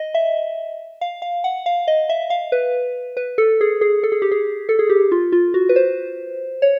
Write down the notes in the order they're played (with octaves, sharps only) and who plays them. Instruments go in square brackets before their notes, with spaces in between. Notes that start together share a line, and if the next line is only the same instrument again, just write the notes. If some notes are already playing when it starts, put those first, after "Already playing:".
Already playing: [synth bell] D#5
E5
F5
F5
F#5
F5
D#5
E5
F5
B4
B4
A4
G#4
G#4
A4
G#4
G4
G#4
A4
G#4
G4
F4
F4
F#4
B4
C5
C#5